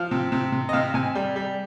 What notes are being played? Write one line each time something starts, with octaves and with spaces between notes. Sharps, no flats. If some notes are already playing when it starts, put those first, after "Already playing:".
Already playing: F3 F5
C3
C3
C3
D#5
C3 F5
C3 G#5
G3
G3